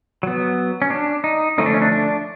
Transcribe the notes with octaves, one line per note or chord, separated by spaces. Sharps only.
F#3 B3
C#4
D4
D#4
D3 F3 A3 C#4 D#4
D4
C#4
D4
D4